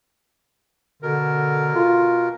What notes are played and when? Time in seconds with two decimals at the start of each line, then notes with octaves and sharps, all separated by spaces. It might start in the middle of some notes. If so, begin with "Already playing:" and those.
1.03 B2 D3 A#4
1.75 F4